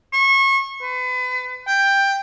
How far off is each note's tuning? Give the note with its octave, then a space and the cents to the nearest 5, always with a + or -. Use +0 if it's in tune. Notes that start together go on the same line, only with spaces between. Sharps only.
C#6 -30
B4 +35
G5 +10